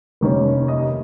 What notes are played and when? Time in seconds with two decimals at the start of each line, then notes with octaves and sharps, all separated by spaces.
0.21 F1 D#2 D#3 A#3 C#4
0.68 D#5